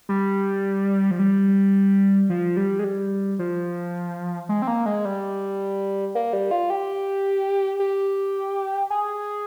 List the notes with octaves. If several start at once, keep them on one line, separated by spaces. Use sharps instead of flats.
G3
F3
G3
F3
G3
G#3
G3
F3
G#3
C4
A#3
G#3
G3
A#3
G3
F4
G4
G4
G#4